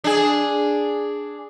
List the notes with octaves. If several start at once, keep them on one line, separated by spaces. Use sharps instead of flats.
D4 G#4